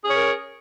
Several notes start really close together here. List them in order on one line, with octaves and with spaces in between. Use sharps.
G#4 C#4 C#5 A#4